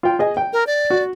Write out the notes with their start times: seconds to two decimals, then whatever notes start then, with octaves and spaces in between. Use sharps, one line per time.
0.03 F4 G5
0.19 G#4 D#5 G#5
0.37 G5
0.53 A#4
0.67 D5
0.90 F#4